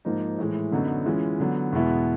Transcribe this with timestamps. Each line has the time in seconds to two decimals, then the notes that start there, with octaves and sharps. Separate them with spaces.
0.05 G#2 F3 A#3 D#4
0.38 A2 E3 G#3
0.72 F#2 D3 F#3 B3 D#4
1.06 E3 G#3 C#4 F4
1.40 D3 F#3 B3
1.72 E2 B2 G#3 B3 E4